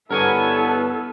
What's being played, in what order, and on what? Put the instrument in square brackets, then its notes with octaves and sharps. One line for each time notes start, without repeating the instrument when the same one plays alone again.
[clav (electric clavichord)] G2 D3 [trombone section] B3 [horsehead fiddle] E4 A4 [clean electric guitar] A#4 C#5 G#5